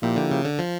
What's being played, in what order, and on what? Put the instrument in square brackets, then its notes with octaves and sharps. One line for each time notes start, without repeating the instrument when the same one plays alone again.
[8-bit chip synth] A#2 [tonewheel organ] F3 A#3 E4 G4
[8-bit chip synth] D3
C#3
D3
F3